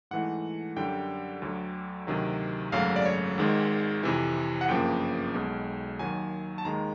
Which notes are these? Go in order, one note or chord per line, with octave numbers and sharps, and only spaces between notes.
G#2 E3 A3 F#5
F#2 D3 G3 G5
D2 D3 F#3
D2 C3 D#3 F#3
G#1 F#2 C#3 F#3 A3 F5
D5
C#5
G#1 G#2 D#3 G#3
F2 C3 E3
F#5
G1 F#2 C#3 F3 A#3 G5
B1 B2 G#3
D#2 D#3 F#3 G#5
A5
D#2 D#3 G#3 A#5